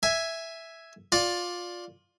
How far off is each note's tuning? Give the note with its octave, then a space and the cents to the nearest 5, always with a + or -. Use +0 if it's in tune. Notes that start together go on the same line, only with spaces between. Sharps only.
E5 +0 G#5 +0
F4 +15 D5 +0